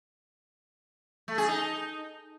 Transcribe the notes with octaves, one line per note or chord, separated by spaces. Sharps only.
A3
G#4
D#4